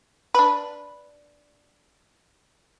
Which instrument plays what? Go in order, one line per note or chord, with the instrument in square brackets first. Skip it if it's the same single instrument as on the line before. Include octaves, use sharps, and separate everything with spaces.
[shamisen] D4 B4